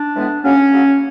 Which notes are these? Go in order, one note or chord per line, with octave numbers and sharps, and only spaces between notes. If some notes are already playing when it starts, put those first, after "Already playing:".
Already playing: D4
A2 E3 G#3 B3
C#3 F#3 A#3 C#4
C#3 F#3 A#3